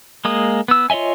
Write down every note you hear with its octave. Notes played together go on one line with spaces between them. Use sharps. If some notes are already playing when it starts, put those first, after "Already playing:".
G#3 A#3 D#6
B3 E6
F4 C#5 D#5 E5 G#5